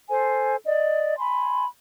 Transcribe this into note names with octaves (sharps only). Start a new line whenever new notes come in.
A4 C5 G#5
D5 D#5
G#5 B5 C6